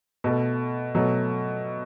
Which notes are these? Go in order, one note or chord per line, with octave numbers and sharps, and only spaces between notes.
B2 A3
B2 F#3 A3